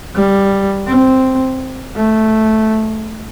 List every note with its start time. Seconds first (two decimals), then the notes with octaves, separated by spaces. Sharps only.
0.15 G3
0.87 C4
1.95 A3